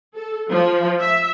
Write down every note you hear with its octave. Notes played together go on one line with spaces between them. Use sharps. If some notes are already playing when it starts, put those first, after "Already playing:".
A4
F3
E5